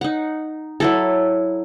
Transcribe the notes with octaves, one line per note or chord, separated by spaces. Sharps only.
D#4 F#5
F#3 E4 A4